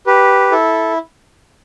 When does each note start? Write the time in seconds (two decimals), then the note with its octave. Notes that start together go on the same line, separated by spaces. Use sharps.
0.07 G4 B4
0.51 E4 A4